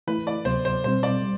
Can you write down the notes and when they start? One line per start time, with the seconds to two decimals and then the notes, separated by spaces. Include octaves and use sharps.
0.07 E3 A3 E4 B4
0.27 D5
0.45 D2 C3 F#3 B3 C5
0.65 C5
0.84 B2 G3 C4 C5
1.03 D5
1.22 G3